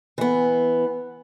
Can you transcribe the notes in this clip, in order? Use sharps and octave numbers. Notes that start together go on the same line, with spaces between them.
E3 B3